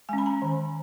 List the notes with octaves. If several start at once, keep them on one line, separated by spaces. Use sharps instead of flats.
G#3 C#4 G#5
B5
A#5
D#3